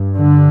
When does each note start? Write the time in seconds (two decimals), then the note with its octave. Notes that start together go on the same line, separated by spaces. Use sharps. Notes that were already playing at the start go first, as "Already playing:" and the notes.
Already playing: G2
0.16 D3